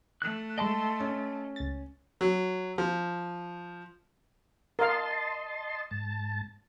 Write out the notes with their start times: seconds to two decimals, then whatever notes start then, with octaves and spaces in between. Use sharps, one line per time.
0.22 A3 F#6
0.58 G#3 D#5 A5 C6 D7
1.00 C#4
1.56 C#2 A6
2.21 F#3
2.78 F3
4.79 A#4 D#5 F5 A5 C6
5.91 G#2 A5